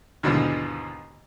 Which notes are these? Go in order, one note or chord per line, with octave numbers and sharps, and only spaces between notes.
D#2 G#2 B2 D3 E3 F3